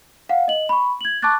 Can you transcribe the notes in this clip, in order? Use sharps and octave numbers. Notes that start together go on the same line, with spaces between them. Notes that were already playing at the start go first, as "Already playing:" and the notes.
F5 F#5
D#5 F#7
B5 C#6
G#6 F#7
A5 C#6 D6 F#6 A6